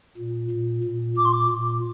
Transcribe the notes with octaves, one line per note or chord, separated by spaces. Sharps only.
A#2
A#2
A#2
A#2 D6
C6
D6
A#2